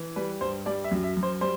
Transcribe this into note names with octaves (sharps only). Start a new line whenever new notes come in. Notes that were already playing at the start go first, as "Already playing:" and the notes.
Already playing: E3
G3 B4
G2 C5
G3 D5
E5
F#2
E5
F#2
C5
G3 C5